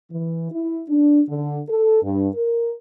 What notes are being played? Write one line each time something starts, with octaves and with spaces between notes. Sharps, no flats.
E3
E4
D4
D3
A4
G2
A#4